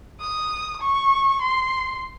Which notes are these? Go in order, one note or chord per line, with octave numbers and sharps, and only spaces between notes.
D#6
C#6
C6